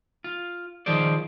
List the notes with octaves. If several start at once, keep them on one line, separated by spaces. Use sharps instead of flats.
F4
D#3 F3 G#4 C5 D5